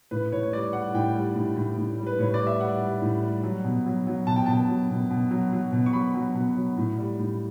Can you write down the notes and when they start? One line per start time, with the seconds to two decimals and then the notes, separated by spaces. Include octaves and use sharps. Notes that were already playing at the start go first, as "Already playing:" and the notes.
0.11 A2 B4
0.32 A2 C#5
0.43 C#5
0.52 G3 D5
0.73 G3 F#5
0.94 A2 G5
1.15 G3
1.36 A2
1.56 A2
1.77 A2
1.98 G3
2.06 B4
2.19 A2 C#5
2.34 D5
2.39 G3
2.47 E5
2.60 G3 F#5
2.82 G3
3.02 A2
3.23 G3
3.43 F#3
3.65 B2
3.86 F#3
4.07 F#3
4.27 B2 A5
4.36 G5
4.46 B2 A5
4.69 F#3
4.90 B2
5.10 B2
5.31 F#3
5.53 F#3
5.72 B2
5.86 C#6
5.93 F#3 B5
6.14 F#3
6.35 B2
6.56 F#3
6.77 A2
6.98 G3
7.19 A2